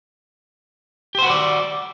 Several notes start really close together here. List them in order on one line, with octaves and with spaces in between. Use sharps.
G4 C5 F#4 B4 D5